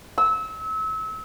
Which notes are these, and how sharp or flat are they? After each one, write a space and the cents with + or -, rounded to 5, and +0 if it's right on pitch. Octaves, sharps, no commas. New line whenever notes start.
E6 -30